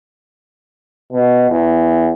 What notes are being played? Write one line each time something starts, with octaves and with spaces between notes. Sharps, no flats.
B2
E2